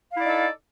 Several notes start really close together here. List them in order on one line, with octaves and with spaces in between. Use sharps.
F5 E4 D5 D#4 A4